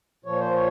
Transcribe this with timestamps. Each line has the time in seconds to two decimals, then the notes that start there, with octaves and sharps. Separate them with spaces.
0.25 A#2 F3 C#5
0.40 C5
0.54 C#5